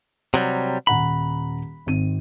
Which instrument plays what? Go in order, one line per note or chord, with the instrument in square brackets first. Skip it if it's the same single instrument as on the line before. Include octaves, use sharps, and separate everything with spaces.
[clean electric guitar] C3 F#3 G3
[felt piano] D#1 F#5 A#5 [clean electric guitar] B5
[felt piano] G#1 C4 D#7